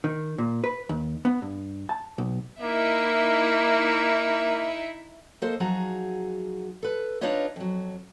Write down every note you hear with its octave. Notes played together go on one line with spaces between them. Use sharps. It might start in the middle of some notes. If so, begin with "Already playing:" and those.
D#3
A#2
B4
D#2
B3
G2
A5
B1
A#3 D#4 E4 E5
A#3 A4 C5 D#5
F3 F#3 D#4 F#4 G#4 A#5
A4 B4
D4 D#4 F4 B4 C#5 D#5
F2 F#3